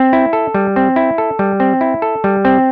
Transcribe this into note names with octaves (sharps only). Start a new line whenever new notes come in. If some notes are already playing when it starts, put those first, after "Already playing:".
Already playing: C4
E4
A4
G3
C4
E4
A4
G3
C4
E4
A4
G3
C4